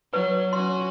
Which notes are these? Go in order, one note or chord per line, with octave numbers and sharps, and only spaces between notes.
F#3 B4
C#4 F#4 C6